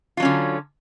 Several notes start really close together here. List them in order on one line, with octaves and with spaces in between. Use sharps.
F4 F#3 C#4 D3